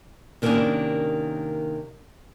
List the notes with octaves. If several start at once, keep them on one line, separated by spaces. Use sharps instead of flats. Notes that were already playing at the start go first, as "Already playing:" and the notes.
C3 D#3 A#3 B3 C#4 D4